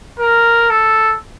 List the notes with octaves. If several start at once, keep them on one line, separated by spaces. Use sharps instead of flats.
A#4
A4